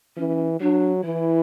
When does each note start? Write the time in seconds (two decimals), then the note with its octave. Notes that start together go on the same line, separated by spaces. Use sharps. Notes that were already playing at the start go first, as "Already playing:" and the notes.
0.17 E3 C#4
0.60 F#3 D4
1.03 E3 E4